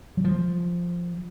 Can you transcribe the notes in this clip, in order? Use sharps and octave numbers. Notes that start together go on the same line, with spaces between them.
F#3
F3